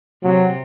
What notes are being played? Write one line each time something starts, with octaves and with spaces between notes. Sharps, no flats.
C3 F#3